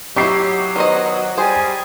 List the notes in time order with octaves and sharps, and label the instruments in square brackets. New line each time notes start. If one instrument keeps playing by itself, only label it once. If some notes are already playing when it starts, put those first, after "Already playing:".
[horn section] F#3 [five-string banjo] D#4 E4 [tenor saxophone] G4 [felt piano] C#6 D6 C7
[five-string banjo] D#3 C5 D#5 [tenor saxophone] B3
[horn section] G3 G#5 [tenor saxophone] G#4 [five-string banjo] C5